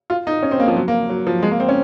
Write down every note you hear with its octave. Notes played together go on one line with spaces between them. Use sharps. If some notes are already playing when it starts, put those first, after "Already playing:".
F4
D#4
C#4
C4
A#3
F3
F#3
A#3
F#3
F3
G#3
A#3
C4
C#4